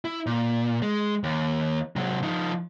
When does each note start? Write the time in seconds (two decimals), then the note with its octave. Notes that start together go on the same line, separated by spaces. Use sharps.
0.05 E4
0.26 A#2
0.82 G#3
1.24 D#2
1.96 C3 F#3
2.23 F3 D#4